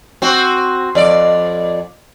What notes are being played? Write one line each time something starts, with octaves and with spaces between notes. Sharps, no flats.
C4 F#4
F2 D5